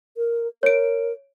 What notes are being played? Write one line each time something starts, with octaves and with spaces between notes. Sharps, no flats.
A#4
A#4 C#5 D7